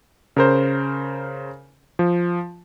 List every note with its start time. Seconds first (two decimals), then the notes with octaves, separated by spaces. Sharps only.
0.37 C#3 A#4 C5
1.99 F3